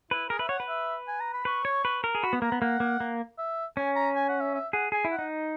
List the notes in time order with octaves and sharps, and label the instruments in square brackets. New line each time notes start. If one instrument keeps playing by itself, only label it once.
[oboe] E4 [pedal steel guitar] B4
[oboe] G#4 [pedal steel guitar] A#4
[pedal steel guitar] B4 [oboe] E5
[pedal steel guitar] C#5 [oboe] F#5
[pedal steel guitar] B4
[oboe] E5
G#5
A#5
B5
[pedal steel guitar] B4 [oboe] C#6
[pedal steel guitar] C#5
B4
A#4
G#4
[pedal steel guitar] F#4 [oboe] B5
[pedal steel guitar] B3
[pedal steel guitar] A#3 [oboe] A#5
[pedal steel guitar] B3
[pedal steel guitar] A#3 [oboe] F#5
[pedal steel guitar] A#3
A#3
[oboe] E5
[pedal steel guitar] C#4 [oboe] G#5
[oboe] A#5
G#5
F#5
E5
E5
[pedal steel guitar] G#4 [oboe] F#5
[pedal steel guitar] G#4 [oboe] G#5
[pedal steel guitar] E4
[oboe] F#5
[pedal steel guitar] D#4